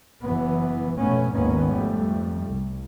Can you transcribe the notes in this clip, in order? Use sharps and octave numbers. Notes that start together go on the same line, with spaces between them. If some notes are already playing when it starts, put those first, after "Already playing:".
F#1 E3 B3
F1 G#2 B2 A3 B3 C#4
G#1 D#2 D#3 A#3 B3 C#4
F2 G3 A3
C2